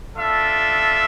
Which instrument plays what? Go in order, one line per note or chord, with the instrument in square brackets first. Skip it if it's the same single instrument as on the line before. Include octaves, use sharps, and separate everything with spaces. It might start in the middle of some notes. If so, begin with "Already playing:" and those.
[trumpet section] D4 F4 A4 E5